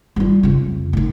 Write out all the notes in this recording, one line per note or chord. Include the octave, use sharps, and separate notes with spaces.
G3 F4
F2 C#3
A2 D#3